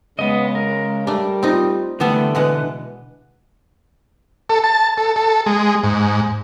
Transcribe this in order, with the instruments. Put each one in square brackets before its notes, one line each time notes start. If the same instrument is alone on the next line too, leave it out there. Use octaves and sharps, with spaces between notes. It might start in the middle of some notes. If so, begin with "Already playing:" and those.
[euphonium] C#3 [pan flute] G#3 [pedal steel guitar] B3 D#5
[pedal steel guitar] A#4
[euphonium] G3 [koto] A3 D4
[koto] C4 D#4 [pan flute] F4
[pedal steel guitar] D3 [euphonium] E3 [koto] G3 B3 A4 [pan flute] A3
[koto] B2 G#3 F#5 [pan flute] B4
[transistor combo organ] A4
A5
A4
A4
G#3
G#2